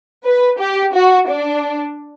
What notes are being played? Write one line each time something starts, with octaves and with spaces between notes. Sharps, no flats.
B4
G4
F#4
D4